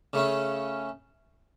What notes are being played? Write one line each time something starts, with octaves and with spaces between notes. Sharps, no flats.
C#3 A3 C#4